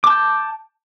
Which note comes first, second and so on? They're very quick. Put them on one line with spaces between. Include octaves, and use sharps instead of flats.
D6 A5 G6